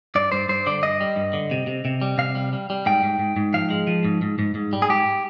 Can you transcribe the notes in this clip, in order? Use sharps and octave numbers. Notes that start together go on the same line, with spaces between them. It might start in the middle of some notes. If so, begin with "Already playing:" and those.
G2 D5
G2 C5
G2 C5
D3 D5
G2 D#5
G3
G2
D3
C3
C3
C3
G3
C3 F5
G3
G3
G3
G#2 G5
G#2
G#2
G#2
F3 F5
G#3
F3
G#2
G#2
G#2
G#2
G3
G#4
G#2 G4